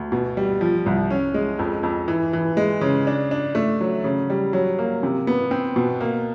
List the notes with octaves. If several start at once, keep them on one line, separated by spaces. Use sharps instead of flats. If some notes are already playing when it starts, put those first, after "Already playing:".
Already playing: D2
B2
G3
F3
C2
C#4
G#3
F2
F2
E3
E3
G#3
C#3
D4
D4
A3
F#3
C#3
G3
F#3
A#3
C3
B3
C4
B2
A#3